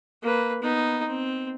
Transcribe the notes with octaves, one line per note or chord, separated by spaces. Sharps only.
A#3 B4
B3 D#4
C4